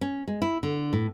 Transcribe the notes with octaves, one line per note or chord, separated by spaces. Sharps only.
C#4
G#3
E4
D3
A2